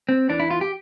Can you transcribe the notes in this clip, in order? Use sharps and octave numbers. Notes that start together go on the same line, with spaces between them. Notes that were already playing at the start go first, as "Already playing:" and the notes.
C4
E2 E3 D4
E4
F4
G4